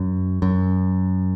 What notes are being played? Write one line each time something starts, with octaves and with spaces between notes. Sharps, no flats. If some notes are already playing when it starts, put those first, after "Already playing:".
Already playing: F#2
F#2